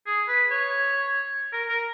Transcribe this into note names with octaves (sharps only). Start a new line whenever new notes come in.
G#4
B4
C#5
A#4
A#4